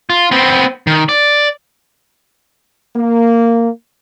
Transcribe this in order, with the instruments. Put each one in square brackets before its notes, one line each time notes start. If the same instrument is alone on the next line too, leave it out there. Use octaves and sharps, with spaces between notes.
[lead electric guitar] F4
B3 C4
D#3
D5
[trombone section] A#3